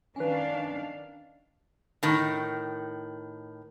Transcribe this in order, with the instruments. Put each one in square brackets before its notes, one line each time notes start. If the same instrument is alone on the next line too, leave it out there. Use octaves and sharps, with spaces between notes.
[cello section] D#3 D4 F5 [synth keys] C#4 B4
[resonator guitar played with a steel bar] A2 D#3